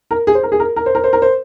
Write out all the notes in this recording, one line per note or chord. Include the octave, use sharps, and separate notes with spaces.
A#4
G#4
C5
A#4
G#4
A#4
A#4
C5
A#4
C5
A#4
C5